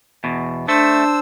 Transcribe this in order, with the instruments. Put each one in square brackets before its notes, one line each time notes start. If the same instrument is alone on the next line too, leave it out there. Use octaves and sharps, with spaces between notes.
[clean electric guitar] E2 B2
[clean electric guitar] A3 [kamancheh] D4 [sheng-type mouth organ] C5 E6